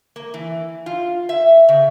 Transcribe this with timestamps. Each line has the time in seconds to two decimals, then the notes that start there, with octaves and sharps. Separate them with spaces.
0.16 A#3
0.34 E3
0.86 F4
1.29 E5
1.69 C#3